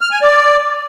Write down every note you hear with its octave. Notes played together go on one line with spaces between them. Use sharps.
F6
G#5
D5